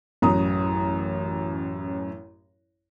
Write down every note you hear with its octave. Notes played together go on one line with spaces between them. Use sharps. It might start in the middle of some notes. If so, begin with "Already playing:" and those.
A1 F#2 A#5 D#6